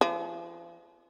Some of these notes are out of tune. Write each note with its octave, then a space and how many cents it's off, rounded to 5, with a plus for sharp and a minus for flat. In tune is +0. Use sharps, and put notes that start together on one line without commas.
F3 -40